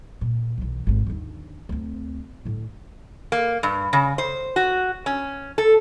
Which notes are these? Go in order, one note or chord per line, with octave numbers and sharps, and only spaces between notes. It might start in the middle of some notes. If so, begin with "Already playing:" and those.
A#2
B1 E3
G#1 C3
D#2 D3
D2 C4
A2 D3
A#3
G2
C#3
C5
F#4
C#4
A4